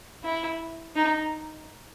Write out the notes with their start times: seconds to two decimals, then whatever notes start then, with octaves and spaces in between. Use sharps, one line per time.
0.24 E4
0.96 D#4